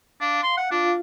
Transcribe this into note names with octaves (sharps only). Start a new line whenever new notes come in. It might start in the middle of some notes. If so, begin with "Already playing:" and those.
D4 F5
C6
F#5
D4 F4 F5